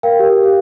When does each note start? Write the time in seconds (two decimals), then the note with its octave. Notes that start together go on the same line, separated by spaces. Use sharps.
0.03 A#4 F5 G5
0.19 G4
0.36 G4
0.43 F5